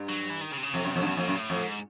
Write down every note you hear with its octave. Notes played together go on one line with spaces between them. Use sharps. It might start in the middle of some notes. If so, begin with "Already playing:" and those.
Already playing: G2
F#3
E3
D#3
C#3
C3
C#3
F2 C3
F#2
F2 B2
G2
F#2
F2 A#2
F#2
A2
F2
G#2